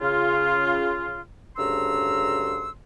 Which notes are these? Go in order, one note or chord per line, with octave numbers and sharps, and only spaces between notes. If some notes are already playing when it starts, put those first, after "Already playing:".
C#3 F4
D2 G2 C#3 A#5 C6 E6